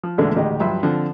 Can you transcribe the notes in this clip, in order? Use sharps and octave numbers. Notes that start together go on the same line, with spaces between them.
F3
E2 A#2 D3 G#3 A3
A1 D2 D#3 G#3 G4 D#5
G2 F3 F#3 E5 B5 C6
D3 F3 C4